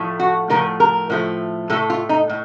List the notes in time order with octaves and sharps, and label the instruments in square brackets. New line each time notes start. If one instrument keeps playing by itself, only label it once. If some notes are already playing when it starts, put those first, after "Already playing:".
Already playing: [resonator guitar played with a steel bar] A2 F3 A3
F#4
A2 F3 A3 A#4
A#4
A2 F3 A3
A2 A3 A4
F4
D#4
A2